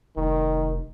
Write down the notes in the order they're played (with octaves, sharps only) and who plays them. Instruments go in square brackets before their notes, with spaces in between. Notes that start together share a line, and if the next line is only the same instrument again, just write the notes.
[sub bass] F1 [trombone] D#3